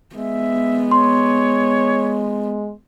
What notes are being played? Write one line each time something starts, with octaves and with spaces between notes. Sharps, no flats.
G#3 B3 E5
C#5 C6